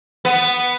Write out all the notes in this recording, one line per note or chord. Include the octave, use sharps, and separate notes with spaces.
B3